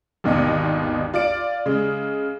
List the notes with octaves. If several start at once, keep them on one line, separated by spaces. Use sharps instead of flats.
G#1 D#2 B2 D3 D#5
F4 D5 D7
C#3 G#3